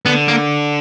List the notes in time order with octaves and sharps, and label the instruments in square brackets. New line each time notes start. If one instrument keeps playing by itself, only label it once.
[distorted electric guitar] D3 [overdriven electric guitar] B3
[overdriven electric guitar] A#3